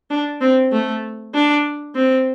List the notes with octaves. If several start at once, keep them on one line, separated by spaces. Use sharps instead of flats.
D4
C4
A3
D4
C4